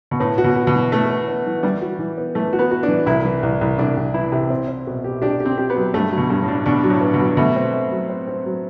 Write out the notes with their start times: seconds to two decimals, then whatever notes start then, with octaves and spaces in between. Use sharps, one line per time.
0.11 B2
0.20 A2 B3
0.38 F#4
0.44 B2
0.56 F#4
0.67 B2
0.74 E3
0.92 A3 B3
1.10 B3
1.28 B3
1.46 E3
1.63 E3 G3
1.82 F#4
1.99 E3
2.18 B3
2.35 E3 A3
2.53 F#4
2.59 B3
2.71 F#4
2.83 D4
2.88 E3
3.06 C2 E4
3.25 E3
3.43 C2
3.61 C2
3.79 C2 D4
3.97 C2
4.14 E3 E4
4.32 C3
4.50 C4
4.68 C4
4.87 B2
5.04 G4
5.22 D4 G4
5.40 G4
5.46 C4
5.58 G4
5.70 B3
5.76 F#3
5.94 G2 A3
6.12 F#3
6.18 B2
6.30 G2
6.42 A2
6.48 D4
6.66 B2 D4
6.84 F#3
6.90 A2
7.01 B3
7.14 B2
7.20 F#3
7.37 B2 A3
7.56 C4
7.73 A3
7.91 F#3
8.09 C4
8.27 C4
8.46 F#3